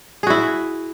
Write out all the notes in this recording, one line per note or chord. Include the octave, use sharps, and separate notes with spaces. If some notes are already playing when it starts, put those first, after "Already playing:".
E4 F#4 G#4